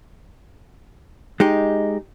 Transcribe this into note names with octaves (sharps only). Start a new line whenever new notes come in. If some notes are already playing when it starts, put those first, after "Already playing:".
G#3 D#4 G4